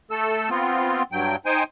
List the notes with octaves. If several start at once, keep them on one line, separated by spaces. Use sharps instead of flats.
A3 A4 E6
B3 C4 F4
G2 F#3 G5
D#4 C5 G5 G#5